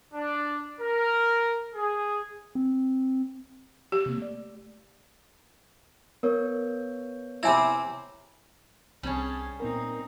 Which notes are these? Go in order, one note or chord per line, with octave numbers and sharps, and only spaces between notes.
D4
A#4
G#4
C4
G4
C3 A#3
A3 D5
B3 A#4 C#5
C3 C4 E4 E5 G#5 B5
C2 G3 C4 C#4 G#4 A5 G#6
A#2 B3 C4 D#4 A#4